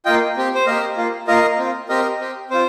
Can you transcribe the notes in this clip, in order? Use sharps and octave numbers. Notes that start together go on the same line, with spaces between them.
A#3 F4 D#5 G5
C4 G4
C5
A#3 G4 A#4 D#5
A#3 F4
A#3 F4 A#4 D#5
C4 F4
C4 G4 A#4 D#5
C4 G4
C4 F4 C5